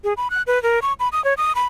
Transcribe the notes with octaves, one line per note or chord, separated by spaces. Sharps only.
G#4
B5
F#6
B4
A#4
C#6
B5
D#6
C#5
D#6
B5